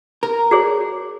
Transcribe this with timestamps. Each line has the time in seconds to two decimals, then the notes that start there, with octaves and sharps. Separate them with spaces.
0.23 A#4
0.51 F#4 G#4 C#5